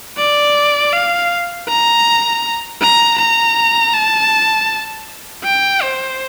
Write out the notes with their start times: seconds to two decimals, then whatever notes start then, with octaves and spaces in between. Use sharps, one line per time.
0.17 D5
0.93 F5
1.68 A#5
2.81 A#5
3.19 A#5
3.93 A5
5.44 G5
5.82 C5